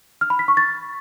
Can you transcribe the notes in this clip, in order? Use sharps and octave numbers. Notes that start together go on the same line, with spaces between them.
F6
B5
B6
C#6
A6